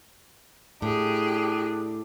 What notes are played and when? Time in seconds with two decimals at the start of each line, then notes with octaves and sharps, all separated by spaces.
0.82 A2 D4 G4 G#4